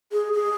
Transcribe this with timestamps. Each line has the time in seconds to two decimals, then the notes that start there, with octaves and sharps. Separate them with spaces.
0.12 G#4
0.33 G#4